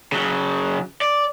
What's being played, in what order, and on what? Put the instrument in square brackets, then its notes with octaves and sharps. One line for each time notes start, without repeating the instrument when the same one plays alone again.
[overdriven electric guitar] C#3 F#3
D5